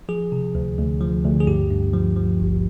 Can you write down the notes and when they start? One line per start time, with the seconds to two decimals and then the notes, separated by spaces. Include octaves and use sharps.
0.09 F3 G#4
0.32 C3
0.55 D2
0.78 D2
1.01 F3
1.24 D2
1.40 G#4
1.47 G2 G4
1.70 G2
1.93 F3
2.16 F3
2.40 G#1